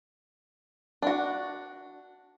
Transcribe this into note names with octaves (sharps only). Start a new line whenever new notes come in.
D4 F#4